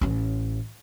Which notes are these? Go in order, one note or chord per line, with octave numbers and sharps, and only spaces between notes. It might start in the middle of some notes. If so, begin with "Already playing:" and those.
A1 C#4